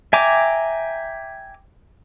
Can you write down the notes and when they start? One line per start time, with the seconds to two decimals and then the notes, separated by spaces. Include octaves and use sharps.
0.13 E5 G5 G#5 A#5 D6